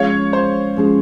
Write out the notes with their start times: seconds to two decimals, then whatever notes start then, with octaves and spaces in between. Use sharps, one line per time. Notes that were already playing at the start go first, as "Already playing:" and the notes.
Already playing: F3 G#3 C#4 G#4 C#5 F5
0.33 C5
0.77 F3 G#3 C#4 G#4